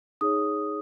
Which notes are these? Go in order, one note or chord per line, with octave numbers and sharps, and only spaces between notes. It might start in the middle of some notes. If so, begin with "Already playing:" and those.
D#4 G#4 C#5 D#6